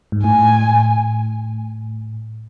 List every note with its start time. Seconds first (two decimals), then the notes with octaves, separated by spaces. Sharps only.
0.12 G#2
0.24 A2 G#5